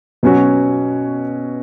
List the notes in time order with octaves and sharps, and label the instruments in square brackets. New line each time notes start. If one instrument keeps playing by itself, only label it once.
[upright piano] B2 F#3 C#4 F#4